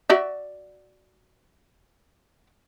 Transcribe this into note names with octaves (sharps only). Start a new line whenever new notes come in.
F#4 D5 E5